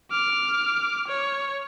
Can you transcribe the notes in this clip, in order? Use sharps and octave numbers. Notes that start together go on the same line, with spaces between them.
D6 F6
C#5